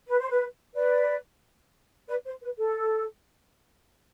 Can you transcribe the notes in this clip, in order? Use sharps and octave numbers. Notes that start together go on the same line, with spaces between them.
B4
C5
B4
B4 D5
B4 D5
C5
B4
A4